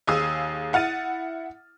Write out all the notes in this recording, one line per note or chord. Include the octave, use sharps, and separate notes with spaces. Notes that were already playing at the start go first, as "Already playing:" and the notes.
D#2 G#4 F5 D#6 E6
E4 F#5 F6 A6 D#7